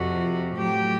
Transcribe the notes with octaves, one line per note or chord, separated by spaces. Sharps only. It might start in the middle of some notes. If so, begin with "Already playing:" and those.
Already playing: F2 C3 F3 F#4
A2 F#3 G4